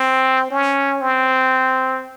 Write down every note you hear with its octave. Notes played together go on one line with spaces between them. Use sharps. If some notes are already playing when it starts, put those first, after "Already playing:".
Already playing: C4
C#4
C4